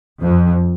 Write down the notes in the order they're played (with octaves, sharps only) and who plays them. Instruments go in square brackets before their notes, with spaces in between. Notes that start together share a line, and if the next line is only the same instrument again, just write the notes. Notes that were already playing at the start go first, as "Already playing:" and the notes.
[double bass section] F2